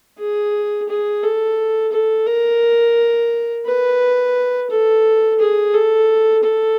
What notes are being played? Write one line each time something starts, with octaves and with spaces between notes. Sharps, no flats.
G#4
G#4
A4
A4
A#4
B4
A4
G#4
A4
A4